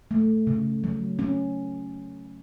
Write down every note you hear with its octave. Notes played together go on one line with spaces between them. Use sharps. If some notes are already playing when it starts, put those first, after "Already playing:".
A3
C#3
F#3
C#4